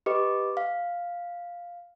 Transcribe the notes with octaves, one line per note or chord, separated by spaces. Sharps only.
G4 B4 D#5 D6
F5